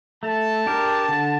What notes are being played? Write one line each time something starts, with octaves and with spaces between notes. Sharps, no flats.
A3 A5
D4 G4 A#4
D3